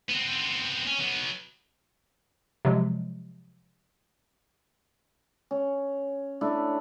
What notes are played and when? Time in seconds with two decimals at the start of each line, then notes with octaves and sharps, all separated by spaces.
0.09 B3 C4
0.87 C#4
0.99 F#3 B3
2.65 C3 F3 F#3 G#3
5.51 C#4
6.41 A3 D4 E4